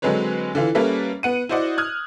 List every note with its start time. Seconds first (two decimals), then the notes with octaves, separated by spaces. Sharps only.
0.02 D3 F#3 G#3 C4 B4 C#5
0.55 D3 E3 F4
0.75 G3 A#3 C#4 A4 B4 E5
1.23 B3 F#5 D#7
1.49 E4 F#4 C5 D5 D#5 F#5
1.78 D#6 F6 F#6 G#6